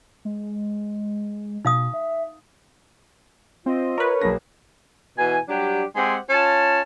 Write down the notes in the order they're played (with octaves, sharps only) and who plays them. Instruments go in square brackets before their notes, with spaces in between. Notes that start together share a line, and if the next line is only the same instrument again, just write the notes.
[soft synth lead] G#3
[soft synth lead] B2 [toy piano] D#4 F5 D#6
[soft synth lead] E5
[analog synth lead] C4 [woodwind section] F4 D#5
[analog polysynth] A#4 B4 [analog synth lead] C#5
[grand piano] B1 A#3 A#6 [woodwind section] D4 G#4
[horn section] B2 E3 G#5
F#3 G3 D4 G4
G#3 C4 G4 F#5 G#5
C#4 F4 A5